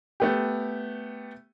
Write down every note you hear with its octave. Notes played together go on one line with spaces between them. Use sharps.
A3 B3 G4